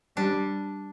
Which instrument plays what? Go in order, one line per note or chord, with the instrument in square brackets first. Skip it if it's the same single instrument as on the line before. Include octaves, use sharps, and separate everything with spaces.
[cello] G3 [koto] D4